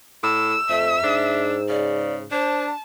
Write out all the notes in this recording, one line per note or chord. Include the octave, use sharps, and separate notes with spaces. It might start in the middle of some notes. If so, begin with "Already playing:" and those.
A2 E6
F2 A3 E5
G#2 D4
C#3 D5
D4 C5 A5